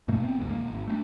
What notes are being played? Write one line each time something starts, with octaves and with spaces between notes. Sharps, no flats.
G2 B2 A3 A#3
F#1 B3 C4
G1 D2 G#2
E1 F#2 A#3
G#1
A3 C4 D4